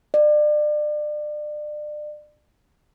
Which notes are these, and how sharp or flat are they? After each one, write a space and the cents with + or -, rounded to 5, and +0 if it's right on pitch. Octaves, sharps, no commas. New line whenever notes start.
D5 +35